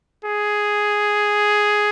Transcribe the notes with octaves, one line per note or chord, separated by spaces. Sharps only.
G#4